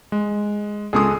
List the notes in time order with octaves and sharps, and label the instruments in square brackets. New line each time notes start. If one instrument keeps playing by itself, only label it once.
[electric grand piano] G#3
[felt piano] C#2 G#3 D#6 [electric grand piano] G#4 A4